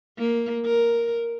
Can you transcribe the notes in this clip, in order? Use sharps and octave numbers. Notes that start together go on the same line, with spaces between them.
A#3
A#4